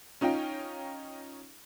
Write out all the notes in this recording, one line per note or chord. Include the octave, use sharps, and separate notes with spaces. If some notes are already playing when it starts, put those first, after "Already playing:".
C#4 D#4 F4 G5